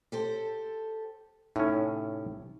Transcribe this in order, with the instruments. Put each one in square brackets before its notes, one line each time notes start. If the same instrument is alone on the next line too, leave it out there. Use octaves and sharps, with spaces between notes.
[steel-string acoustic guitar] G4 A4 C5
[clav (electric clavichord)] A2 C#4 [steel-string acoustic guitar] C3 [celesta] D#4